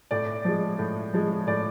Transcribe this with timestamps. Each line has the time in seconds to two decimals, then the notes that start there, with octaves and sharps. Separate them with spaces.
0.11 A2 D5
0.45 F3 G#3
0.79 A2
1.14 F3 G#3
1.47 A2 D5